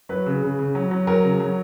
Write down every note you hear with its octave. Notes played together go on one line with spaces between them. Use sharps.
F#3 B4
C#3
C#3
C#3
F#3
F#3
F#3 A#4
C#3
F#3